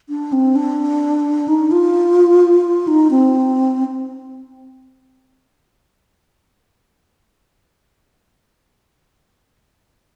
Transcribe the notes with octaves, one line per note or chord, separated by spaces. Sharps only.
D4
C4
D4
D#4
F4
D#4
C4